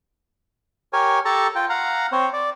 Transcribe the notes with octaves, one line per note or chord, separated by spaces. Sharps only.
G4 A#4 C#5 G#5
G4 A4 A5 A#5 C#6
F4 G5
F5 F#5 A#5
C4 C5 C#5
D5